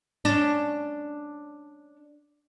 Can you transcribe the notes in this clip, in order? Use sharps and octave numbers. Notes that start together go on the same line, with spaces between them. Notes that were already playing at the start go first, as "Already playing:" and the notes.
C#4 D4